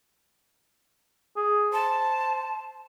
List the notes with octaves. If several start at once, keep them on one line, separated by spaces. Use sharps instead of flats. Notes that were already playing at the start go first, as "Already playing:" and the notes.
G#4
C5 A5